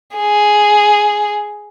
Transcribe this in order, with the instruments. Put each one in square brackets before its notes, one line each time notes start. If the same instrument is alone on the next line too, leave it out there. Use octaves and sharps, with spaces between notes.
[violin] G#4